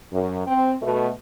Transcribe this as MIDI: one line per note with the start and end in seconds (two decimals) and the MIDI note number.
0.13 0.47 42
0.47 0.76 60
0.82 1.10 47
0.82 1.10 57